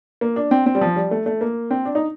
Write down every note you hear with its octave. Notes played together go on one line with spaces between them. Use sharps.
A#3
D4
C4
C4
G3
F3
G3
A3
A3
A#3
C4
D4
D#4